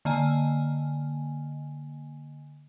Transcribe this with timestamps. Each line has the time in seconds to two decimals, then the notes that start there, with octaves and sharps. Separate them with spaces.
0.05 D3 A#3 D#5 G#5